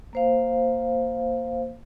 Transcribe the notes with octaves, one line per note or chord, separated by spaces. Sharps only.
A#3 C5 F5